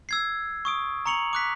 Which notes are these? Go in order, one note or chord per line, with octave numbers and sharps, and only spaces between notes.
E6 G#6 C7
C#6 D#6 D7
A#5 C#6 C#7 F7 F#7
D6 F#6 B6